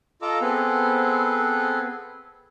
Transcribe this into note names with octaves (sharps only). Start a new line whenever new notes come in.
F4 A4 D#5 A#5 D6 E6
B3 C4 G#4 A4 B4 C5